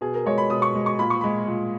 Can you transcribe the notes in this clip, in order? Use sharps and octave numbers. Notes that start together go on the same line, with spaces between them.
B2 G#4
A#4
G#3 C#5
B5
B2 D#6
C#6
G#3
C#6
A#2 B5
C#6
G#3 B5
A#2